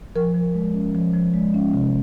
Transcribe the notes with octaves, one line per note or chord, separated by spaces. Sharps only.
F3 A#4
F3
G#3
C#4
F3
F3
G#3
C#4
C3